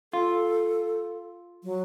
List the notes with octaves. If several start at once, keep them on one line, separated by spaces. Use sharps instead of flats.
F4 A4
F#3